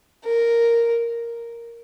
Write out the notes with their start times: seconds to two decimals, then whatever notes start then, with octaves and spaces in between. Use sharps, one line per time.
0.25 A#4